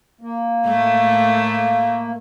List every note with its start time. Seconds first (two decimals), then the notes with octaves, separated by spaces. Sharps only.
0.21 A#3
0.66 A2 A3